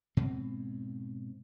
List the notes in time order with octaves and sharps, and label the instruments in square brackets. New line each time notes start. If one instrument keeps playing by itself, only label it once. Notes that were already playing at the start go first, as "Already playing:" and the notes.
[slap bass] G#2 B2 C4